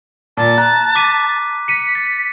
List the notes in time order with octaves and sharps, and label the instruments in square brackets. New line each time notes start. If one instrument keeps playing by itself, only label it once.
[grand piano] A#2 [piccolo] A5
[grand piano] A#5 [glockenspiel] F#6
[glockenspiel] D6 B6 D#7
[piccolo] B6 [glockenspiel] C#7 D#7
[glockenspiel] A6